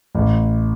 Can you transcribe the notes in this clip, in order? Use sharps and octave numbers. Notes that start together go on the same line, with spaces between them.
A1